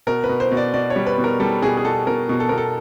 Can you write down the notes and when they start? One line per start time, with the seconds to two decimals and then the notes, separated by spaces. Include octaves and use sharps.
0.07 B2 A#4
0.24 B4
0.29 B2
0.40 C5
0.51 B2
0.57 D5
0.74 B2 D5
0.90 C#5
0.96 G3
1.06 B4
1.18 B2
1.24 A#4
1.40 G3 A4
1.62 B2 G#4
1.77 G#4
1.85 B2 A4
2.07 B2 A#4
2.29 B2
2.40 A4
2.49 B2 A#4
2.58 A4